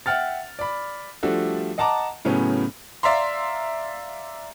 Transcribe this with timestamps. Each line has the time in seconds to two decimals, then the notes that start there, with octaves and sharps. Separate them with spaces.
0.06 E5 F#5 G5 F6 A6
0.59 D5 B5
1.23 F3 G3 A3 D4 F#4 A4
1.78 D#5 F#5 A5 A#5 D6
2.25 A2 C#3 F#3 B3 C#4
3.03 D5 E5 F5 A#5 C6